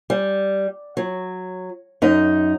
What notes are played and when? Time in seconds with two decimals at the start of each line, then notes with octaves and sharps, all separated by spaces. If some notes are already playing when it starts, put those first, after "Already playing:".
0.10 G3
0.97 F#3
2.02 F#2 D#4